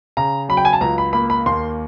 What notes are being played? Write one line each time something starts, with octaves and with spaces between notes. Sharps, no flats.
C#3 A#5
F#3 B5
G5
G#5
A5
C#2 A#5
B5
A#3 B5
B5
D#2 C6